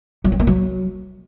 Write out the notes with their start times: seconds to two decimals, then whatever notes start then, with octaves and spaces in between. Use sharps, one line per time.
0.24 F#3
0.32 C4
0.39 A#3
0.47 F#3